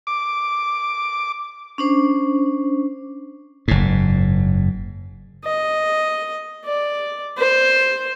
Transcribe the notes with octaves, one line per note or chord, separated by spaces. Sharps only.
D6
C#4 D4 C5
F#1 G#2
D#5
D5
C5